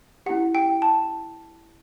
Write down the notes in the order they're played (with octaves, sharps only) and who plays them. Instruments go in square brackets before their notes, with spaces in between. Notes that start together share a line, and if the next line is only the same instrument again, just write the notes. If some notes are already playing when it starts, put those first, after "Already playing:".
[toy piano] C#4 E4 G4 [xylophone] F#5
[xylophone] G5
A5